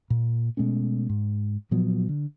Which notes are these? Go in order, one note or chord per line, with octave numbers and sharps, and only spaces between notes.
A#2
B2 G#3 A3 C#4
G#2
A#2 F3 F#3 B3
D3